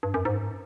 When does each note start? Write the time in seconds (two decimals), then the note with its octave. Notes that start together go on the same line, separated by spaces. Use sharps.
0.03 G2
0.14 F#2
0.25 G#2